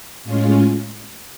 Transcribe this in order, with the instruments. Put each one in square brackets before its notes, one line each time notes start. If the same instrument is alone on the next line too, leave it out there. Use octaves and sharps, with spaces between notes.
[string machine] A2 G#3 C#4 F4